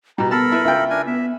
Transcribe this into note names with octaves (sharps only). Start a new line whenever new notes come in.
B2 G3 A#5
B3 A4 A#4 A5 B5
E4 B4
C#2 F4 E5 G5
D4 A#4 G#5
B3 E5